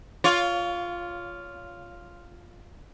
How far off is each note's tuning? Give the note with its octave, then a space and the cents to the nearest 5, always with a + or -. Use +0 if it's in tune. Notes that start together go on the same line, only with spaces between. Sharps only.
F4 +0 C#5 +25